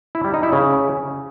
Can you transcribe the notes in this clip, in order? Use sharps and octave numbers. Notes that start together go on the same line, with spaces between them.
E4
G3
D#4
E4
C#3